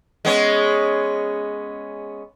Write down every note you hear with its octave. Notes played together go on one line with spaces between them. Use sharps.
G#3 B3 C#4